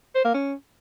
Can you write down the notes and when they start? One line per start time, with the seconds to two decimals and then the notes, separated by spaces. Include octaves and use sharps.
0.15 C5
0.25 A#3
0.34 C#4